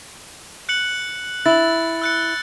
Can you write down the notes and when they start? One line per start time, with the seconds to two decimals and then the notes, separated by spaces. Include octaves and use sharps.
0.69 F#6 C#7 F#7
1.46 E4 A6 F#7
2.02 E6 F#6 C#7